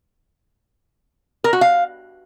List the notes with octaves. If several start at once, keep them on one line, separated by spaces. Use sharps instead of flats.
A#4
F#4
F5